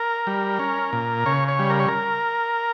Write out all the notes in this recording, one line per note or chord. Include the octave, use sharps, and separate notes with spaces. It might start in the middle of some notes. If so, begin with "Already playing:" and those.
Already playing: A#4
G3
C#4
A#2
C#3 C#5
C#5
G3
A#4
C#5
A#4